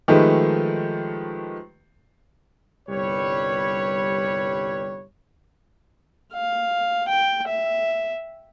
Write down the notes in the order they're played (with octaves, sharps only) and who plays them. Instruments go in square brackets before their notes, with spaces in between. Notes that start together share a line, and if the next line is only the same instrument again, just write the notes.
[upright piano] D#3 F3 G#3 A3 G4 B4
[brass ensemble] G1 C2 G3 B4 C#5
[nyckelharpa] F5
G5
E5